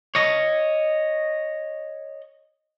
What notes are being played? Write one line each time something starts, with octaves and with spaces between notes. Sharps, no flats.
C#5 D#5